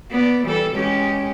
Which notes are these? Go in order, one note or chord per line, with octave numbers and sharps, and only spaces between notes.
B3 D5
E3 G3 A4
G#3 C#4 G4